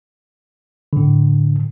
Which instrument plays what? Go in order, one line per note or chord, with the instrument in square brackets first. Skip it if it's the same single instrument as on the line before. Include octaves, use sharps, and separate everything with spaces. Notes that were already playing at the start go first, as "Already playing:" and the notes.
[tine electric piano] A2 D3